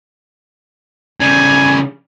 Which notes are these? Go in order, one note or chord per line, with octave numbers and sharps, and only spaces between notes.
C#3 G3 G#5